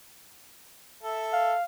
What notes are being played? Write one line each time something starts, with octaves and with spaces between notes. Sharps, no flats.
A4 E5
F5